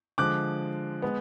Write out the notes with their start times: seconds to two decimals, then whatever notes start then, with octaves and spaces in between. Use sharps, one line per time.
0.18 D3 F3 G#3 D6 F#6
1.02 G#3 B3